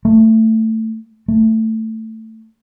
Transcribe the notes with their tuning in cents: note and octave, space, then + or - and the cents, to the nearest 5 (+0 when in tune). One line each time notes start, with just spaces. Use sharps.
A3 +15
A3 +15